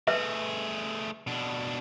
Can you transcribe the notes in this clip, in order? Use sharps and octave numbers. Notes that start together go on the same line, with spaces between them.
A3 G#4 B4 E5
B2 D4